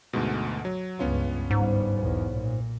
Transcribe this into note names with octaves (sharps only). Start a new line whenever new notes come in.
D2 G#2 B2
F#3
C#2 G2 B3 C#4 F4
G1 G#2 G3
B1 E2
A#2